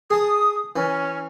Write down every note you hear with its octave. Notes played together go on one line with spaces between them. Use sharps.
G#4 A5 D#6
E3 C#4